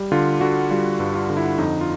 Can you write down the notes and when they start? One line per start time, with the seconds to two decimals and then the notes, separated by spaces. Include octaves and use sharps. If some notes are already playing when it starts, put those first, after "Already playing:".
Already playing: G3
0.12 D3 F4
0.41 D3 F#4
0.70 G3 F4
1.00 G2
1.15 F4
1.30 D3
1.37 E4
1.58 F2 D#4
1.81 F4